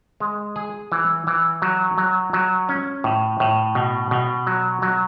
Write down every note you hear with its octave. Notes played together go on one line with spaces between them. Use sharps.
G#3
G#4
E3
E3
F#3
F#3
F#3
C#4
A2
A2
B2
B2
F#3
F#3